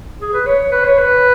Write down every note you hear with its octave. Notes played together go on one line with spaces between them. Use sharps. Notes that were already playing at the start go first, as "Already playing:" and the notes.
G#4
B4
C#5
C#5
B4
C#5
B4